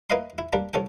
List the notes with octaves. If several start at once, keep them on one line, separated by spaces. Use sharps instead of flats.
A#3 E4 B4 D#5 F5 C6
E4
G3 A#3 D4
C2 C#4 A4 G5